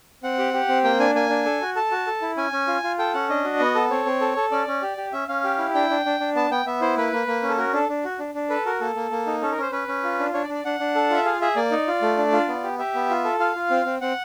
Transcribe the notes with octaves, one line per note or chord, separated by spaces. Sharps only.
C4 F#5
G4
G4
C4
A#3 G5
D4 G#5
A#3 G#5
D4
A4
F#4
A4 A5
F#4
A4
E4
C#4 G#5
C#4
F4
F4
A4 G5
C#4 F#5
D4 D#5
F#4
B3
A4
C4 C#5
C4
A4
A4
C#4 D5
C#4
G4
G4
C#4 E5
C#4 F5
G4
E4
D4 G5
D4
D4
D4
B3 A5
B3 G5
B3 E5
E4 C5
A#3 B4
A#3
A#3
C#4
A4
F#4 A#4
D4 A4
D4
F#4
D4
D4
A4 B4
F#4 A#4
A#3 A4
A#3
A#3
D#4
C#4 A4
A#4
C#4 C5
C#4 B4
C#4
F4
D4
D4 C#5
D5
D4
D5
D4 F#5
D4
A4
F4 E5
G#4 F5
G#4 E5
A#3 D5
D#4
F4
A3
D4
F4
B3
G4
G4 E5
B3
F4
A4
F4 F5
F4
C4
C4
C4 F#5